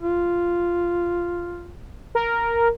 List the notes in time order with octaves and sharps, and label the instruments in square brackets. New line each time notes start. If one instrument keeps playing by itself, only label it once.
[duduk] F4
[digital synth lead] A#4